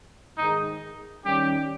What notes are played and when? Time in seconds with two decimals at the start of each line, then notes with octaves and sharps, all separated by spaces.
0.37 G#2 D#3 G#3 D#4
1.25 D#3 G3 C#4 G4